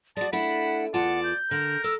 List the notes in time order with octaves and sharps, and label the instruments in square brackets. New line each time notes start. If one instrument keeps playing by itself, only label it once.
[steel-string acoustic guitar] G#3 F#4 [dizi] D5 [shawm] A5
[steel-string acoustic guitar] A3 D4 E4 [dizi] F#5 [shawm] B5
[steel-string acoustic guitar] E2 F4 A5 [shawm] D5 [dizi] F#5
[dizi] G6
[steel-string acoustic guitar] D3 [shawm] A#4
[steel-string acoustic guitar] A4 [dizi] E6